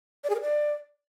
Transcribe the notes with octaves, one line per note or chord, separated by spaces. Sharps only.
D5
G#4
A#4
D5